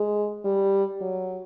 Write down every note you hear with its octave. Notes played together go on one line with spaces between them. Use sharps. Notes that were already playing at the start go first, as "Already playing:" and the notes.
Already playing: G#3
G3
F#3